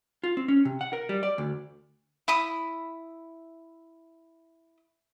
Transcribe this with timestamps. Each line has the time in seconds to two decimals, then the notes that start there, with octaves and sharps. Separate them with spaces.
0.24 F4
0.37 C4
0.48 C#4
0.65 C3
0.81 F#5
0.93 A#4
1.09 G3
1.23 D5
1.38 D2
2.28 E4 B5 D#6